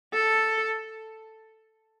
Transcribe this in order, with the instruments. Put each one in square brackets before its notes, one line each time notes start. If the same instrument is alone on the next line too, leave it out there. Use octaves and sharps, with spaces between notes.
[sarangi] A4